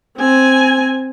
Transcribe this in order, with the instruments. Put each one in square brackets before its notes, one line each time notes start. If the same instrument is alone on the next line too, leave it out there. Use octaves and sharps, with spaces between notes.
[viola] C4 G#5